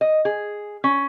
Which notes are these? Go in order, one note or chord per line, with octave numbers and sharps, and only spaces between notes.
D#5
G#4
C#4